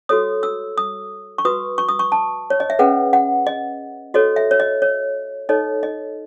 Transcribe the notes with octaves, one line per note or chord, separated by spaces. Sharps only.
F#4 A4 C#5 D#6
E6
D#6
C#6
F#4 B4 D#6
C#6
D#6
C#6
A5
C#5
D#5
E5
C#4 G#4 B4 F#5
F#5
D#5
F#4 A4 C#5 D#5
E5
C#5
D#5
C#5
D#4 A4 C#5 D#5
D#5